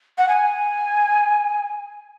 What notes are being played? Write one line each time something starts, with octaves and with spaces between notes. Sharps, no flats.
F#5
G#5